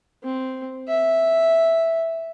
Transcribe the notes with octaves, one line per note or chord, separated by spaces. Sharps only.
C4
E5